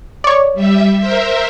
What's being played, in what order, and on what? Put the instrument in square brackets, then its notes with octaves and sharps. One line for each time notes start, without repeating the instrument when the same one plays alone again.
[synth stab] C#5 D5
[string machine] G3 E5
A#4 C5 E5